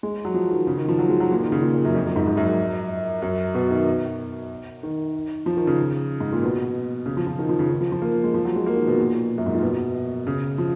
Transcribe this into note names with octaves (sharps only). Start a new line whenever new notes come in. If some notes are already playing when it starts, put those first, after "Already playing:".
G#3
F#3
F3
D#3
C#3
D#3
F3
F#3
G#3
F#3
A#2
D#3
C#3
A#2
A#2
F#2
F2
F#2
G#2
G#2
F#2
F#2
F#2
B2
D#3
D#3
F3
D#3
C#3
G#2
A#2
B2
C#3
F3
F3
D#3
F3
C#3
D#3
F3
F3
A#3
G#3
F3
F#3
G#3
A#3
D#3
B2
A#2
F#2
G#2
A#2
B2
C#3
F3